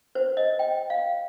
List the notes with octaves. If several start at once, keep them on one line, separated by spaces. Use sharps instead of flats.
C5
D#5
G5
F5